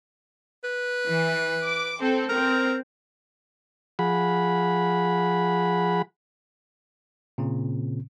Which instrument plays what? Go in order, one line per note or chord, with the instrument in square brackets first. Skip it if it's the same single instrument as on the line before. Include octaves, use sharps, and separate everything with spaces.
[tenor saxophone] B4
[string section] E3
D6
C4 A4
[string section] C4 [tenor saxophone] A#4
[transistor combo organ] F3 G#4 F#5 B5
[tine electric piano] A#2 C#3 C4